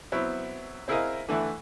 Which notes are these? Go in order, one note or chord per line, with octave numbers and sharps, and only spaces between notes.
F#3 B3 C4 E4
C4 E4 G#4 A#4 D#5 F5
D3 E3 A3 E4